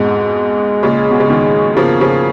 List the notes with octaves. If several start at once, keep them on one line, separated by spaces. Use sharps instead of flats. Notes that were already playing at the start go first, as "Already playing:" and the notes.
Already playing: F2 G#2 B2 G#3
A#2 C#3
B2
C#3
B2 D#3
C#3 F3 A#3
C#3 F3